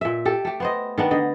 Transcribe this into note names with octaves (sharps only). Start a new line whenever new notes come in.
A#2 E5
G4 A4
A3 G4
B3 C5 D#5
D#3 B3 D4
D3 D#5